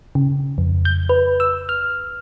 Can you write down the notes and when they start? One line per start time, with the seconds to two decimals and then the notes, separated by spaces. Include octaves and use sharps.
0.15 C#3
0.58 F2
0.85 G6
1.09 B4
1.40 E6
1.69 F6